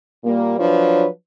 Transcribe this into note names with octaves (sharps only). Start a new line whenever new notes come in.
A#2 G3 A#3
F3 F#3 D4 B4 C#5